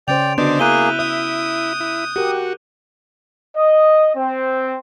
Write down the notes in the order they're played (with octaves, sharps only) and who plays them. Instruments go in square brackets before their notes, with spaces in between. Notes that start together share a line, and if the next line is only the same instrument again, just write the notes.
[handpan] C#3 C#4 C5 [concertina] D5 G5 [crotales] D7 F7
[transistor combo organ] D3 D4 [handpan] B3 F#4 [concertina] C5 D#5 [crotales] G6
[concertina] A#3 G#4 [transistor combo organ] E4 [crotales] F#6 D#7 G7
[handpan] E5 [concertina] D#6
[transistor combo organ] E4
[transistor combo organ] F#4 [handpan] G4 A#4
[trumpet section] D#5
C4